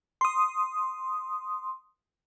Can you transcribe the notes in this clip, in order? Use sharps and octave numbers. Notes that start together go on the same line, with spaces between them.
C6 D#6